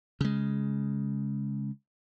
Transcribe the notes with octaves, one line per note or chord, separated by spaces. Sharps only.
C#3 G#3